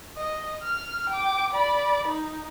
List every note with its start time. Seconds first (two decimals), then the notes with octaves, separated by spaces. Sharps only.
0.17 D#5
0.63 F6
1.10 G5 D6
1.54 D5 B5
2.08 D#4